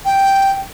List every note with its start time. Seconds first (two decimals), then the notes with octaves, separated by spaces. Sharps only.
0.05 G5